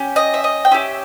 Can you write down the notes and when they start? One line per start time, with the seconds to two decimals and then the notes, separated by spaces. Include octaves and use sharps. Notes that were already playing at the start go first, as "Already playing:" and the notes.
Already playing: C#4 G4
0.16 D#5
0.34 E5
0.44 D#5
0.65 G5
0.71 C#4 G4 E5